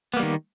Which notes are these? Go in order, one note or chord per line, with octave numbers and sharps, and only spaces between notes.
D#3 G3 A#3 B3